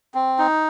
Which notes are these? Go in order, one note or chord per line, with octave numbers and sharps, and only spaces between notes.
C4
D#4